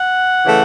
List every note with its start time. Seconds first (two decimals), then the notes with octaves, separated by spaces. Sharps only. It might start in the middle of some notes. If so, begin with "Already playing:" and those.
Already playing: F#5
0.45 C#3 E3 A3